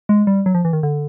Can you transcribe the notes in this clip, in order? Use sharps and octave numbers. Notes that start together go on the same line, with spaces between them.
G#3
G3
F#3
F3
E3
D#3
D3